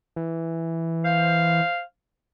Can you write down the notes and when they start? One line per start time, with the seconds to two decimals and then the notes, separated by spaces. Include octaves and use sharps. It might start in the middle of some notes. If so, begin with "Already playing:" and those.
0.16 E3
1.04 C5 F5